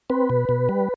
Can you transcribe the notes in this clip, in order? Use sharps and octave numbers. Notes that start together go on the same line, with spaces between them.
C4 B4
B2
B2
G3